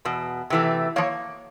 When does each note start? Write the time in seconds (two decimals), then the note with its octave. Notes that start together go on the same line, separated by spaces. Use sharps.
0.05 E2 B2
0.50 C3 E3 A3
0.96 F3 A#3 C#5